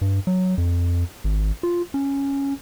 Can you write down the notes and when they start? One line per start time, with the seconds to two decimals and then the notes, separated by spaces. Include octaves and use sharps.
0.01 G2
0.27 F#3
0.58 F2
1.24 G#1
1.63 F4
1.94 C#4